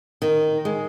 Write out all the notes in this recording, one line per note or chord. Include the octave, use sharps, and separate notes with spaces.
D#3
G#3